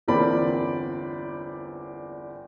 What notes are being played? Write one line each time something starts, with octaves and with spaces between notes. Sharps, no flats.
G1 E2 A#3 C4 D5 B5